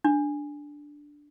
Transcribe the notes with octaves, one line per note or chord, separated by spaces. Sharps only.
D4